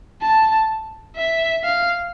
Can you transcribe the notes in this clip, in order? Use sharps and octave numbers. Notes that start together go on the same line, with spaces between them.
A5
E5
F5